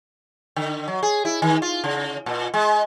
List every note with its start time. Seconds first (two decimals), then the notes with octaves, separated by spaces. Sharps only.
0.56 D3
0.88 F#3
1.03 G#4
1.25 E4
1.42 D#3
1.62 F4
1.84 C#3
2.26 A#2
2.54 G#3